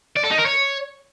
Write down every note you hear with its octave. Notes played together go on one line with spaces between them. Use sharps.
D5
A4
D#4
A#4
C#5